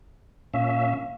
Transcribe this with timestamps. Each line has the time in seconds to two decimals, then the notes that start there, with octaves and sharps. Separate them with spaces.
0.54 A#2 C#4 E5 F5